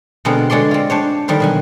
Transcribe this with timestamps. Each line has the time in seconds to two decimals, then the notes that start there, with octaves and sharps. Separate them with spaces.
0.25 B2 D3 G#3 B3 C4 A#4
0.50 D3 G#3 C#5 D5 C6
0.71 C4 F4
0.90 D4 C5 C#5
1.28 D3 D#3 G3 A#4 C5
1.40 B2 F#3 G#5